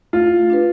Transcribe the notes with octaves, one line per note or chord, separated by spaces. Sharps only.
A3 F4
D4 G4 B4